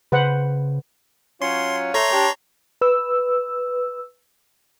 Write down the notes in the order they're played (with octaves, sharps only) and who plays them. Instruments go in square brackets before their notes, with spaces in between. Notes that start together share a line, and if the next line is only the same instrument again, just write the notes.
[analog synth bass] C#3 [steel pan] B4 C5 F#5
[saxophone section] F#3 C#4 F4 [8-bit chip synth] C6
[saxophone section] A3 [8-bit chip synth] C#5 A#5 C6
[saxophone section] D4 G4
[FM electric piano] B4 E6